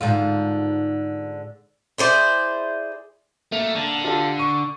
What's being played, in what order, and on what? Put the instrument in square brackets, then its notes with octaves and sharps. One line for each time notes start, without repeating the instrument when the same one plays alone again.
[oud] G#2 D3 F4
[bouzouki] E4 G#4 C5 D5
[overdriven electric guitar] A3 [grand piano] A#3 F7
[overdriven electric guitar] D3
[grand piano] F4 G4 A4
C#6 D#7